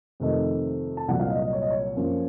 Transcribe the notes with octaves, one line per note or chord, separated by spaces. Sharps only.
F2 C3 D#3 A3 D#4
A5
C2 A#2 F#3 F#5
F5
D#5
D#5
C#5
D#5
C#5
F#2 F3 A#3